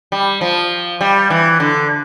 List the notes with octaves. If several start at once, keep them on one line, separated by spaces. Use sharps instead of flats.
G3
F3
G3
E3
D3